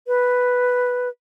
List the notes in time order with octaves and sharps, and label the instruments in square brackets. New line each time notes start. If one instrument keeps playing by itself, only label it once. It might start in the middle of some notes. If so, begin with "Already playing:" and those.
[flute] B4